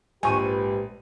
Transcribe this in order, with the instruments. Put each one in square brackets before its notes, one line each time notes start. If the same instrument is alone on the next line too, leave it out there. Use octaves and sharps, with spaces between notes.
[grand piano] A#1 D#7 [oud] G#2 [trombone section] G4 B4 [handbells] G#5 C#6